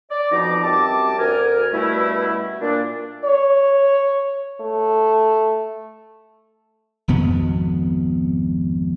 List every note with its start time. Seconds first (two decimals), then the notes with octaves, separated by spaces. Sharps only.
0.10 D5
0.32 F2 B2 F3 D#4 A#5 D6
0.63 F#2 G3 C4 A5 D6
1.18 D2 A#4 G#5 F6
1.72 G2 B2 G3 A3 C#4 E4
2.60 A#2 A#3 D4
3.25 C#5
4.61 A3
7.08 G#1 F2 B2 B3